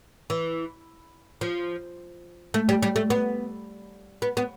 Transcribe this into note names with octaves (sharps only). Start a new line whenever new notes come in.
E3
F3
A3
G3
G3
A3
B3
B3
B3